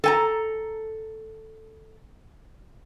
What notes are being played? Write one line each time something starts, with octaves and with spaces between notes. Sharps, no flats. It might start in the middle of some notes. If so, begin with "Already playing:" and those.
A4 G#5 A#5